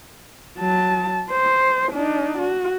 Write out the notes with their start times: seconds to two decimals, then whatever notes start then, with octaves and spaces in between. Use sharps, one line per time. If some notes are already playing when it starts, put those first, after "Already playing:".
0.59 F#3 A5
1.30 C5
1.92 D4 D#4
2.38 F#4